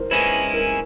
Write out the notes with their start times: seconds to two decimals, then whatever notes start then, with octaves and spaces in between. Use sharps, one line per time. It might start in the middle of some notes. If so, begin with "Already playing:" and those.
Already playing: A#4 C5
0.11 G#3 C#4 E4 B4
0.54 A#4